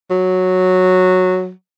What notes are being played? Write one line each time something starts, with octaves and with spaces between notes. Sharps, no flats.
F#3